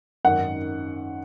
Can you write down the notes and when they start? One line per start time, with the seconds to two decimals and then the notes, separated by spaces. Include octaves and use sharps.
0.25 G#1 F#2 D#3 F#5